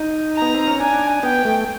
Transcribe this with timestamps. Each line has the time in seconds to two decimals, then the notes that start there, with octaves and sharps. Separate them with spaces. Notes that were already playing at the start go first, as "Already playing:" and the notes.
Already playing: D#4
0.37 B3 A#5
0.55 C4
0.67 C#4
0.80 D4 G#5
1.23 B3 G5
1.45 A3